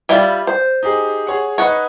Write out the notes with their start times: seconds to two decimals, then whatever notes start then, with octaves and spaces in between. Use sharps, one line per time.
0.09 G3 E4 F4
0.47 C5
0.83 D#4 G4 G#4
1.27 G#4 C#5 F#5
1.58 D#4 B4 C#5 D#5 F#5